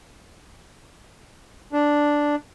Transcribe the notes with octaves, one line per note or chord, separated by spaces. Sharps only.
D4